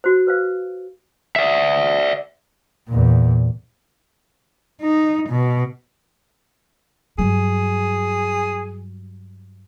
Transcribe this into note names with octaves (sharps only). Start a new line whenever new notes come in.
F#4 C5
B4 C5 F5
D5 E5
E2 A#2
D#4
B2
G2 F#3 G#4